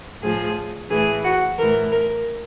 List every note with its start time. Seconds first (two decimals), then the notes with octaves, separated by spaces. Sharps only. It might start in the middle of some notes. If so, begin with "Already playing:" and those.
0.22 A2 F3 G#4
0.90 A2 E3 G#4
1.24 F#4
1.57 A2 E3 A#4
1.92 A#4